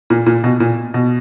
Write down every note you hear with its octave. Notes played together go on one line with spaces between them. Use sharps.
A#2
A#2
B2
A#2
B2